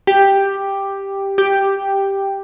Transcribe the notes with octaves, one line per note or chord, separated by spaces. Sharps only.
G4
G4